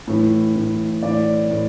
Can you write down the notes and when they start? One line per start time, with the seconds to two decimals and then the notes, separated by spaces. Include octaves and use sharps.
0.07 A2 E3
0.55 A2 E3
1.03 A2 E3 D5
1.51 A2